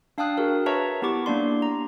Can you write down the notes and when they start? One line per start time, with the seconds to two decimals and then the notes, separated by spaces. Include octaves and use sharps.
0.18 D4 F5 G5 A5 D#6 F#6
0.38 F#4 G#4 A#4
0.66 B4 C#5 E5 A5 A#5 C#6
1.02 B3 E4 G4 C#6 D6
1.26 A#3 D4 D5 C6
1.62 A#5